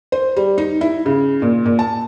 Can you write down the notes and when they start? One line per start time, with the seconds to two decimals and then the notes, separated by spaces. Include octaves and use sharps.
0.12 C5
0.37 G3
0.58 D#4
0.81 E4
1.06 C#3
1.42 A#2
1.66 A#2
1.79 A5